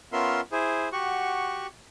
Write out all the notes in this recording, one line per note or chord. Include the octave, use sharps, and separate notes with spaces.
B3 C#4 F4 A#4 E5 C6
E4 G#4 C5
F#4 G4 F#5 C#6